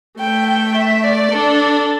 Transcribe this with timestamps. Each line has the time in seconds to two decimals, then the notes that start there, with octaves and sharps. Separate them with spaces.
0.18 A3 G5
0.47 G5
0.75 E5
1.03 D5
1.31 D4 A4